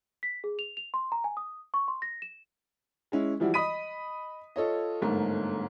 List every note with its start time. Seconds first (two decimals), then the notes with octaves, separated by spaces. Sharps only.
0.23 B6
0.44 G#4
0.59 F7
0.77 F7
0.94 C6
1.12 A#5
1.24 G#5
1.37 D#6
1.74 C#6
1.88 C6
2.02 A#6
2.22 E7
3.12 G#3 C#4 E4
3.40 E3 F3 G3 E4 F#4
3.54 D#5 B5 D#6 B6 D#7
4.56 F4 A4 C#5 D#5
5.02 G1 G#2 A3 A#4